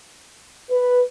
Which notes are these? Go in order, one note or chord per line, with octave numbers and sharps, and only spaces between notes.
B4